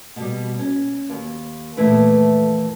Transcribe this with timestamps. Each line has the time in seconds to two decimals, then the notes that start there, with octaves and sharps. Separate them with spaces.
0.16 B2 G3
0.59 C#4
1.09 D#2
1.77 F2 A#2 E3 A3 E4 B4